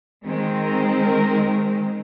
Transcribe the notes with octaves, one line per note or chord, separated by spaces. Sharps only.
D#3 G#3 C4
A#4
A#4